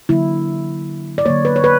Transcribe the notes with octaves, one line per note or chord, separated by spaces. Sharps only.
D3 F#3 A#3 E4
D5
D3 F#3 A#3 C#5
B4
C#5
B4